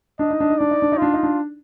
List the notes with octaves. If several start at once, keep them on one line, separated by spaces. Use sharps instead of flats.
D4 D#5
D#4
D4
D#4
D4 D5
D#4
D4
D#4
D4 F4
D#4
D4